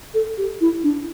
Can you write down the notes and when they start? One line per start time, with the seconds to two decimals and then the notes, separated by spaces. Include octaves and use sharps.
0.14 A4
0.38 G4
0.61 E4
0.84 D4